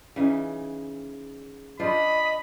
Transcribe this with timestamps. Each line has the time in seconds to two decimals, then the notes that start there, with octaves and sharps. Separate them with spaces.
0.16 C#3 E3 D#4
1.80 D4 F4 C5 D#5 B5